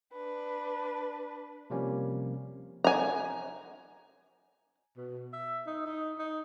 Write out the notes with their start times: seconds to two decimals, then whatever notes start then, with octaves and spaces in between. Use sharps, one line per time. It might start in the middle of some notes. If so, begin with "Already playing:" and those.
0.13 D4 B4
1.70 C3 F3 G3 A#3 C#4
2.84 G#5 A#5
4.97 B2
5.33 E5
5.66 D#4
5.85 D#4
6.19 D#4